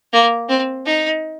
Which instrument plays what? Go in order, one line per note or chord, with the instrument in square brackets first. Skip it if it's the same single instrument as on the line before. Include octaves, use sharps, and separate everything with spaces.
[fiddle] A#3
C4
D#4